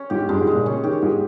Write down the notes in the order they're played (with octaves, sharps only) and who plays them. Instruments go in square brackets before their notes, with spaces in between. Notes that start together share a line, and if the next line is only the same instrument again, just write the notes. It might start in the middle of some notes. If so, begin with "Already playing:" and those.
Already playing: [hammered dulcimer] C#4
[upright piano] G#2 [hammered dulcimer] G4
[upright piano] G2 [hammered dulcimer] G#3
[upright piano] G#2
[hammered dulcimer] G#3
[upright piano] A#2
[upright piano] C#3 [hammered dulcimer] C#4
[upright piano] D#3 [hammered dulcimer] G4
[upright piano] G#2 [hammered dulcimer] G#4